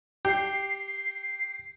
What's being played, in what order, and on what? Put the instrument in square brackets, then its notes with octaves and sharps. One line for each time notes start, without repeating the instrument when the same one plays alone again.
[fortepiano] G4 [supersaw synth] C7